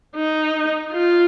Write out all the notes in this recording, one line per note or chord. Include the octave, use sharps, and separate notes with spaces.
D#4
F4